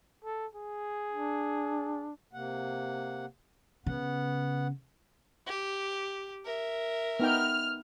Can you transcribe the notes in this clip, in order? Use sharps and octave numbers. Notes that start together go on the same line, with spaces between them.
A4
G#4
D4
C3 A#3 F#5
C#3 B3 F#5
G4
A#4 E5
B3 D#4 G5 F6